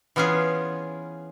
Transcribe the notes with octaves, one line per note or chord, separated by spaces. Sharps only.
E3 B3 C#4 F4 G#4